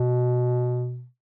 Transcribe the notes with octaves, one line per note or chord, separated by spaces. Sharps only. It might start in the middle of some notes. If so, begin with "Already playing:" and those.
Already playing: B2